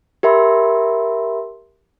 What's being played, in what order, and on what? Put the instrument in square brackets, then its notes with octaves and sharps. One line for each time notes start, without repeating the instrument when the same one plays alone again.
[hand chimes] G4 A#4 E5 B5 C6